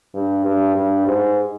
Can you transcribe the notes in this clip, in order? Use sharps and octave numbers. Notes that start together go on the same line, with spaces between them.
G2
G2
G2
G#2